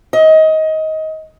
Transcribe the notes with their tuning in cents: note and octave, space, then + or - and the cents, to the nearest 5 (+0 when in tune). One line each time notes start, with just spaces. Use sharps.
D#5 +20